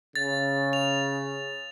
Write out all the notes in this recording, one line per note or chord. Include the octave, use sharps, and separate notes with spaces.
C#3 A6
F7